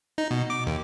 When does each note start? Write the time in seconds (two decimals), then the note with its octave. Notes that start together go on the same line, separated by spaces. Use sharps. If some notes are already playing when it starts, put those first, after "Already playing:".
0.18 D#4
0.31 B2
0.50 D6
0.67 D#2